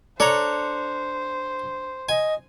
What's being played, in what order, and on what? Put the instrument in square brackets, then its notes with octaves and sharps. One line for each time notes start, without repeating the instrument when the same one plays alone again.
[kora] D4 [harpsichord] A4 C#5 A#5 [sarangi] C5
[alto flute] D#5 [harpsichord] G#5